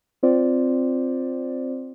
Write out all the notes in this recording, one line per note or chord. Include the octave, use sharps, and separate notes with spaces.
C4 F4 C5 D5